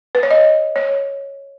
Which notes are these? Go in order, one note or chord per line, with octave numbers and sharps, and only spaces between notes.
B4
C#5
D#5
C#5